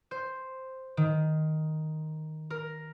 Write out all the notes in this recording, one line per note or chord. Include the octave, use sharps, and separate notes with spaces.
C5
D#3
A#4